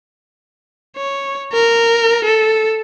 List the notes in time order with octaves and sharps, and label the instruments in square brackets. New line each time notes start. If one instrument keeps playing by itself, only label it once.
[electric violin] C#5
A#4
A4